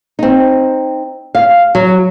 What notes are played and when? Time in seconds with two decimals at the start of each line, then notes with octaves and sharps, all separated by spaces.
0.19 C4 D#4
1.35 F5
1.75 F#3